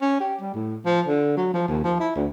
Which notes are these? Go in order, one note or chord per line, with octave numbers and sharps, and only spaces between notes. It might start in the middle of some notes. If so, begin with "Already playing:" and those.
C#4
G4
G3
A2
F3
D3
F#3
F3
D#2
F3
E4
D2